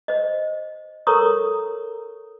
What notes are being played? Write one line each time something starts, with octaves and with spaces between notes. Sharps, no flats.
C5 D#5
A4 A#4 C#5 A#5 C#6 D#6